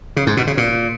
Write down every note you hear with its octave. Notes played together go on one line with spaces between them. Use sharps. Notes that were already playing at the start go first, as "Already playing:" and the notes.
C#3
G#2
B2
C#3
A#2